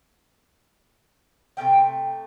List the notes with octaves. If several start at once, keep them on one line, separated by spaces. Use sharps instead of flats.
C3 A3 C#4 G5